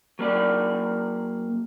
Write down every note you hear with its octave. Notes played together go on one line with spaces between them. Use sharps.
F#3 A#3 D5